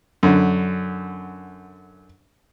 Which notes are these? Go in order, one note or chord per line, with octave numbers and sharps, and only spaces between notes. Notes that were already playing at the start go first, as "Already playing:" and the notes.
F#2 D3